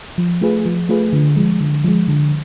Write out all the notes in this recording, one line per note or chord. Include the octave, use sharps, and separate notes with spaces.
F3
A3 F4 G#4 B4
F3
A3 F4 G#4 B4
D3
F3 G#3
D3
F3 G#3
D3